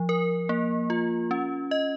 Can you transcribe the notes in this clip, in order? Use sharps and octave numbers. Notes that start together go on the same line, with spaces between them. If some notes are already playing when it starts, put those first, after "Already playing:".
Already playing: F3
A#4
A#3
F4
C#4
D#5